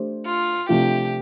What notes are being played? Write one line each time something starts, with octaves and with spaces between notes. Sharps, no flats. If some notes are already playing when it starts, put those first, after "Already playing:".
Already playing: A3 D4 G4 C5
F4
C3 F3 A3 D4 F4 G4